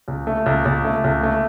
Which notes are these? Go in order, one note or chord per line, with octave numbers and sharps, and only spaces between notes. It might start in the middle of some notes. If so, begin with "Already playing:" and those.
C#2
A3
C#2
C#2
A3
C#2
A3